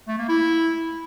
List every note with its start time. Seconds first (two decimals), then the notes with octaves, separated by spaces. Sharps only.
0.08 A3
0.18 A#3
0.28 E4